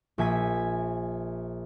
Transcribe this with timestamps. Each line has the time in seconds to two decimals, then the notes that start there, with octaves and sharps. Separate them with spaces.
0.18 A#1 E5 G#5 B6